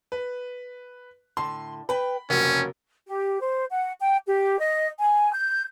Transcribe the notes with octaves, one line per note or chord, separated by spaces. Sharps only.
B4
A2 D3 C6
B4 G5 B5
F1 C#3 F#3 A#3 C#4
G4
C5
F#5
G5
G4
D#5
G#5
G6